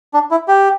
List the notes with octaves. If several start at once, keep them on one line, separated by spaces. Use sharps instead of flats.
D4
E4
G4